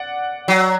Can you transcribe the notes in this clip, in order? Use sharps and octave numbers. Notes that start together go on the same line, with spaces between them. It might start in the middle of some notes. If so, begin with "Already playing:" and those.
Already playing: D5 F#5
F#3